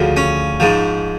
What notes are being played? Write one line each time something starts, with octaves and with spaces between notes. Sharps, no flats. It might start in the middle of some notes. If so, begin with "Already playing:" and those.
Already playing: D2 C#3 F3
C#4
G#2 F3